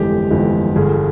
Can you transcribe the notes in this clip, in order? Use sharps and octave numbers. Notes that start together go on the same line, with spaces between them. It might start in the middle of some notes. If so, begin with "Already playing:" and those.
Already playing: G1 F2 E3 G#3 G4
G1 F2 E3 G#3
G1 G2 G3 G#4